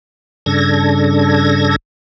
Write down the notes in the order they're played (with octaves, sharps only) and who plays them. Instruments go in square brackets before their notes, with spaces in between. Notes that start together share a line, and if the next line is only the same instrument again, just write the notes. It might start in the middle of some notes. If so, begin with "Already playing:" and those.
[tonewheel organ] G2 C#3 D4 A4 G#6 A#6